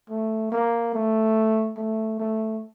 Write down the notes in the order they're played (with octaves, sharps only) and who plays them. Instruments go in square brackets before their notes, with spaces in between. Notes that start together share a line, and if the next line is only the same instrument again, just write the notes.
[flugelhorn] A3
A#3
A3
A3
A3